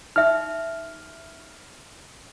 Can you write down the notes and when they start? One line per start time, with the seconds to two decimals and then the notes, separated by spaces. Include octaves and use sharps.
0.16 D#4 E5 F6